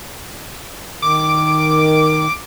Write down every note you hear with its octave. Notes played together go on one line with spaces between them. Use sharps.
D#3 D6